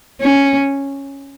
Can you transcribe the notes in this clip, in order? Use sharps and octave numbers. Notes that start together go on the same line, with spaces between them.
C#4